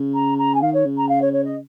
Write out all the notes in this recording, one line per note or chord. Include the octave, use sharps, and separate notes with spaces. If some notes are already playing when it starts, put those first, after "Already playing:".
Already playing: C#3
A#5
A#5
G#5
D#3 F5
C#5
C#3
A#5
F5
C#5
C#5
D#5